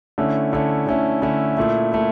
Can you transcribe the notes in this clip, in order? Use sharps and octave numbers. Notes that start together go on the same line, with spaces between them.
D3 A3 C#4 E4
D3 A3 C#4 E4
D3 A3 C#4 E4
D3 A3 C#4 E4
A#2 A3 E4
A#2 A3 E4